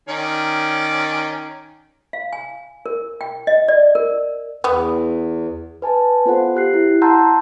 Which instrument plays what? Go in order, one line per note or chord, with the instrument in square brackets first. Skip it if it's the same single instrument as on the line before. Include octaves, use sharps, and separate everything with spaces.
[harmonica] D#3 C#4 D5
[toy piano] F5
G#5
A#4
G5
D#5
D5
A#4
[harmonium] E2 [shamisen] B3
[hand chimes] B4 G#5 A5
B3 F4 A4 C5 F#5
G4 F#6 C7
E4
F#5 A5 A#5 C6 E6 G6